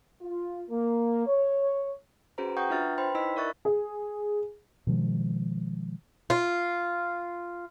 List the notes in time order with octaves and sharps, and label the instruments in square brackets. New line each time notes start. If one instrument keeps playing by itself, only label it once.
[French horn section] F4
A#3
C#5
[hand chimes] C#4 F#4 G#4 B4 C5 A#5
F#5 G5 A#5 C#6 D#6 G6
D4 F4 B4 E5 F6 A6
B4 C5 G5 B5 C6
D#4 E4 D#5 B5 E6 B6
A#4 D5 E5 C#6 F#6 A6
[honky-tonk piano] G#4
[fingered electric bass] B2 D#3 F3 G#3
[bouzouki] F4